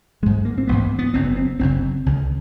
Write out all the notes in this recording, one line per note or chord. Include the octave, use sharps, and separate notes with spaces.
A1 G#2 G#3
A#3
C4
A1 G#2 B3
B3
F#1 F#2 C#3 C4
B3
C4
F#1 F#2 C#3 C4
C#2 C#3